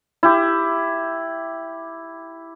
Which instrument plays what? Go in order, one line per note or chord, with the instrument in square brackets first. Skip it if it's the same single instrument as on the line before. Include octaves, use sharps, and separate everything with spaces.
[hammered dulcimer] E4 G4